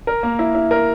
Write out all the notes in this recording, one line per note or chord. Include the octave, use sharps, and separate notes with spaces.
A#4
A#3
E4
E4
A#4